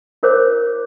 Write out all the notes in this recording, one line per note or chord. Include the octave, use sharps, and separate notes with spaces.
E4 A#4 C5 C#5 D6